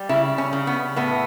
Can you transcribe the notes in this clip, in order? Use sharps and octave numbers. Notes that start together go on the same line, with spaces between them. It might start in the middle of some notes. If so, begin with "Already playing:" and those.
Already playing: G3
C#3 E4
C#4
C#3
B3
A2 B3